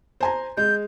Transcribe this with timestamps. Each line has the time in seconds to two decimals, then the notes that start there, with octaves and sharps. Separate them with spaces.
0.21 C5 G#5 A#5
0.57 G#3 G6